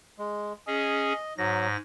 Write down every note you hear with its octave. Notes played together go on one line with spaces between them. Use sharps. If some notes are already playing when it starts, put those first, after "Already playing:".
G#3
C#4 G#4 D#5
G#2 F#3 A#6